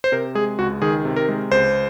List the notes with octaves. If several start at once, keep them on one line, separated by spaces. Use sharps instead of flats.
C5
C3 A#4
G#3 G#4
C#2 F#4
D#3 G#4
C3
A#4
G#3
C#2 C5